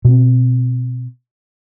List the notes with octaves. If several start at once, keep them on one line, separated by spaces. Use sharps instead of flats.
B2 C4